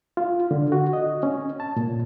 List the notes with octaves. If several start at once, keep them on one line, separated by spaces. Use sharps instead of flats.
F4
D3
F#4
D#5
C#4
A5
A#2